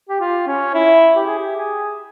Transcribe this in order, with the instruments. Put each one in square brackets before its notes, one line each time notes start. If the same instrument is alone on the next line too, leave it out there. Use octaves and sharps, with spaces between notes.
[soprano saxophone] G4
F4
C#4
E4
G4
G#4
G4
G#4